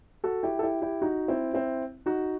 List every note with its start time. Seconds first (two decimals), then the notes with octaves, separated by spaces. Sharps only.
0.24 F#4 A4
0.43 E4 G4
0.59 A4
0.63 E4 G4
0.82 E4 G4
1.02 D#4 F#4
1.28 C4 E4
1.54 C4 E4
2.06 D#4 F#4